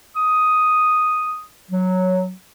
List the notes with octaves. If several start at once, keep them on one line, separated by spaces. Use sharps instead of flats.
D#6
F#3